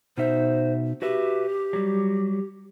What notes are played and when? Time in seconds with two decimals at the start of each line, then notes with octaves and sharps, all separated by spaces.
0.17 B2 D#4 C5 E5
1.02 F#4 G4 B4 E5
1.73 F#3 G3